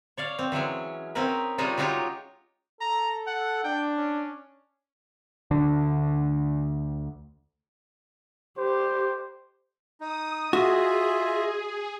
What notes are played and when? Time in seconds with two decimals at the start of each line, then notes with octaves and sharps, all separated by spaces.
0.17 C#5 D5 F5
0.39 C4
0.52 E3 F#3 G#3 C#4
1.15 C4 C#4 D#4 A#4 B4
1.58 C3 G3 G#3 C#4 D#4 F4
1.77 F#3 G#3 D#4 F4 G4 C#5
2.81 A4 A#5
3.27 F#5
3.64 D4 G5
3.97 C#4
5.51 D2 D3 D4
8.58 G4 C5
10.00 D#4 D#6
10.53 F4 F#4 G#4 D#5 E5